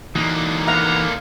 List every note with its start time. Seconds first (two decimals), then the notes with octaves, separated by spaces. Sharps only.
0.15 D3 E3 A#3 D#4 F#4
0.68 B3 F5 F#5 A#5